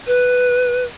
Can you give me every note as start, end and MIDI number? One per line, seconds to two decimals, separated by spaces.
0.07 0.84 71